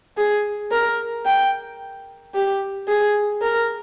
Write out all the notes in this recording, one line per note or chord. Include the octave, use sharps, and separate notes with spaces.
G#4
A#4
G5
G4
G#4
A#4